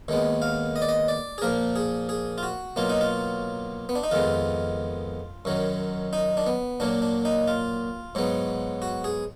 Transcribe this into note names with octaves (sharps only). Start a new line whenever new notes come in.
D#2 D#3 G#3 B3
F5
D#5
D5
D#5
D5
G#4
A#2 F3 A#3 A#4
G#4
G#4
F4
F#4
B2 F#3 A#3 F4
D#4
F4
B3
D4
D#4
F2 D#3 G#3 B3 F4
F#2 D#3 F#3
D#4
D4
B3
A#2 F#3 A#3 D4
D4
D#4
F4
G#2 F#3 B3
F#4
G#4